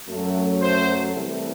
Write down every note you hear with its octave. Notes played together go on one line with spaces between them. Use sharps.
F#2 F#3 A3
C5
C2 C3 E3 A3